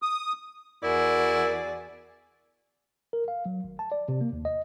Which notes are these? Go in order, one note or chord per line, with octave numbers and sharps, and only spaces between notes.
D#6
E2 E4 F#4 G#4 A#4 D5
A#4
F5
F#3
G#1
A5
D5
C3
A#3
D#2
D#5